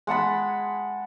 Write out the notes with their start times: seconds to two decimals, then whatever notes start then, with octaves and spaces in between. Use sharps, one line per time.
0.07 G#3 F#5 A5 B5